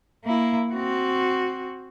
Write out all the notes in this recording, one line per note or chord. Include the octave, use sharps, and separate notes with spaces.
A#3 E4
C4 F#4